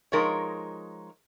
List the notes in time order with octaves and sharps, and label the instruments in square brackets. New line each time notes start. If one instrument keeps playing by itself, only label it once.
[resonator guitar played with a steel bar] F3 G#3 D#4 A#4 C#5